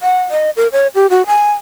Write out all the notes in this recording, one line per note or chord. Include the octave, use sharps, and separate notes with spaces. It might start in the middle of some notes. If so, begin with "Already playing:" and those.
F#5
D#5
A#4
C#5
G4
F#4
G#5